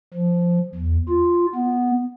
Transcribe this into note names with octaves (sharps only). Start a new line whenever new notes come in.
F3
E2
F4
B3